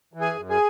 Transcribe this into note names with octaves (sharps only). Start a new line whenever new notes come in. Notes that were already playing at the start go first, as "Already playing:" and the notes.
E3
G#4 G#5
F#2
G#4 G#5